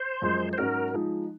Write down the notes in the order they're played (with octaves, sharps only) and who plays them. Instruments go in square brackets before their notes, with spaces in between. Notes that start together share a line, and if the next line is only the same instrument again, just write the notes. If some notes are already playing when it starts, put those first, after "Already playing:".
Already playing: [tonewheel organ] C5
[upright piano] F#2 F3 G#3
[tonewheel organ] C5
[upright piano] G#2 F#3 C#4 F#4 [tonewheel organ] A#4
[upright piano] F3 G#3 D#4